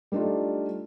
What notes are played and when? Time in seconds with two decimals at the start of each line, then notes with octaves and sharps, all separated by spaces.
0.12 G3 A3 D4 D#4 F4